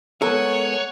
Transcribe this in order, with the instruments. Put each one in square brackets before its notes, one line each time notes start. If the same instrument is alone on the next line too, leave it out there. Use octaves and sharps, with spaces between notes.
[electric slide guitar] G#3 B3 A#4 [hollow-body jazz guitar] A4 [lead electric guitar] C#5 [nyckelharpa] F#5 G#5